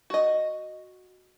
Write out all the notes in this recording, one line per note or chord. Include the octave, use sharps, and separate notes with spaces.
F#4 D#5